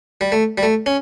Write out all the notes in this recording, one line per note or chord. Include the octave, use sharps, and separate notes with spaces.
G3
A3
G3
A3
C#4